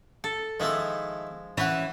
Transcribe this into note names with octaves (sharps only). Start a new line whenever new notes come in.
A4
D#3 F3 G#3 E4 A4
E3 C#4 F#5